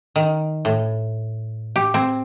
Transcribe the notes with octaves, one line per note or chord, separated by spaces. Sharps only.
D#3
A2
G4
C4